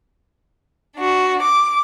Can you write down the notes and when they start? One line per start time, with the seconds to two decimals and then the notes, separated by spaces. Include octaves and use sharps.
0.96 D4 F#4
1.43 D6